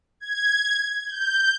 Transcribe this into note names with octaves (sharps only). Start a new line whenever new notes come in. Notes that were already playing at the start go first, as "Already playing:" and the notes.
G#6
G6